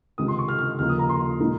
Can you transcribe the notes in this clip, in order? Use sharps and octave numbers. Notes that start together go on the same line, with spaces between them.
C#2 C3 D#3 G#3 D#6
C6
C#6
F6
F6
D#2 C#3 F3 A#3 F6
D#6
A#5
C6
A#2 G#3 D#4